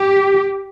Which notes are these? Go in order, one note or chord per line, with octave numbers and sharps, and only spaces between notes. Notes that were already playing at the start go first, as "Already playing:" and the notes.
Already playing: G4